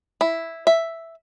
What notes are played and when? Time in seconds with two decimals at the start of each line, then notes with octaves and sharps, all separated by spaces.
0.21 E4
0.67 E5